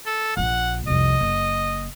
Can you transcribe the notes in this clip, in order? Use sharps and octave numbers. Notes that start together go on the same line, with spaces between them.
A4
A#1 A#2 F#5
C2 F2 D#5
F#1